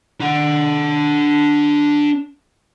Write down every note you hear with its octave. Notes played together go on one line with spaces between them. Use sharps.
D4 F#5